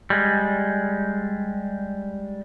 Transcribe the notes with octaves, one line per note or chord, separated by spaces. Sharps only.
G3 G#3